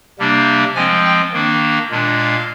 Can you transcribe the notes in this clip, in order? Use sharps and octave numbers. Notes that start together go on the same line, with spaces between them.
C3 G3 A#3 D4
F3 G#3 C4 G#5
G5
D#3 A#3 D4
A#2 G#3 D4
F5